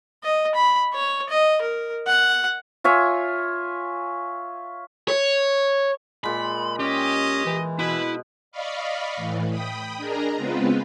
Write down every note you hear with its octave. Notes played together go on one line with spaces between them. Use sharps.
D#5
B5
C#5
D#5
A#4
F#5
F4 C#5 E5 G#5
C#5
A#2 G#3 B5
C#4 G4 D#5
E3
B2 E4 B4
D5 D#5 F5 B5 C#6
A2 E3
G5 B5 D#6
D4 G#4 A#4 D#5 A#5
C#3 G#3 B3 C4 F4 B4